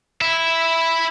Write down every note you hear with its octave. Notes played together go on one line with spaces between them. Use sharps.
E4 E5